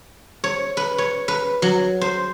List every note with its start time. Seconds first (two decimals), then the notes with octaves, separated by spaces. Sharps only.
0.44 C#5
0.77 B4
0.98 C#5
1.28 B4
1.62 F#3
2.01 C5